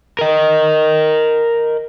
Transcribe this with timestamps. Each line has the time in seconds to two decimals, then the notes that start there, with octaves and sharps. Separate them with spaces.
0.19 A#4 D#5